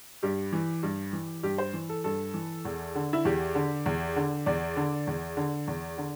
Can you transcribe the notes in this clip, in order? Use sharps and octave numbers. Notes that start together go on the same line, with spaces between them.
G2 G4
E3
G2
E3
G2 G4
C5
E3
A4
G2 A4
E3
E2
D3
E4
E2 G4
D3
E2
D3
E2 D5
D3
E2
D3
E2
D3